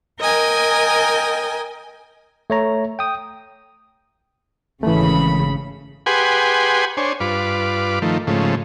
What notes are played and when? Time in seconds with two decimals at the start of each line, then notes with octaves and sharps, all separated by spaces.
0.18 A#4 D#5 G5 G#5
2.50 A3 C#5 A#5
2.99 G5 D#6
4.83 G#1 C#3 E3 A3 B5
6.06 G4 G#4 B4 F#5 G#5 C6
6.97 D4 C5 C#5 G#5
7.20 G2 F4 B4 D6
8.02 D#3 F3 A3
8.27 G#2 C#3 F3 A3